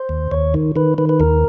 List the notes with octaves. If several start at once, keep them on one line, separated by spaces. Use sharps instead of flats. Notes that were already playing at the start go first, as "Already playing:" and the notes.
Already playing: C5
D#2
D#2 C#5
D#3
D#3 B4
D#3 B4
B4
D#2 A#4